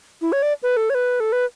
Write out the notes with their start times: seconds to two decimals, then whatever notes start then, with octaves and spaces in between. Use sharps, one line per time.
0.22 E4
0.32 C#5
0.42 D5
0.63 B4
0.77 A4
0.90 C#5
0.95 B4
1.20 A4
1.32 B4